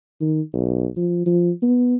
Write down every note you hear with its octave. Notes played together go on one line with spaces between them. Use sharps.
D#3
B1
F3
F3
B3